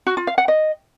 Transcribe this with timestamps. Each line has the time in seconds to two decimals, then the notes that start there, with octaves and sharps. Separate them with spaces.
0.07 F#4
0.17 F4
0.27 F5
0.38 F#5
0.48 D#5